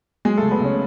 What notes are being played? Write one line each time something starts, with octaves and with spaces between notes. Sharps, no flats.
F#3 G#3 G#4
C#2 A3 A4
B3 B4
C#2 C#4 C#5